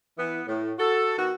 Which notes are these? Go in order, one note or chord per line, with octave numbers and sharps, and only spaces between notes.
E3 B3
A2
F#4 A4
D#3 B3 F#4